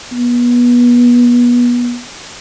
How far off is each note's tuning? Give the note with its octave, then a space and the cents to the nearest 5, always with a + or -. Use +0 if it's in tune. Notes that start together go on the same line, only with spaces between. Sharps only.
B3 -30